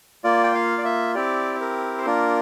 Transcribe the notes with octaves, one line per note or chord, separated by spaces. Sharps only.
A#3 F4 D5
G5
F5
D5
E5
C4 E4 G4 D5
A#4
C5
A#3 D4 F4 A#4